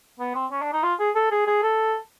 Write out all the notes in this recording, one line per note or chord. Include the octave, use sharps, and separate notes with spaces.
B3
C4
C#4
D4
D#4
F4
G#4
A4
G#4
G#4
A4